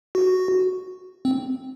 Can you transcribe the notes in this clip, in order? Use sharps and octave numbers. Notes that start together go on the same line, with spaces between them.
F#4
C4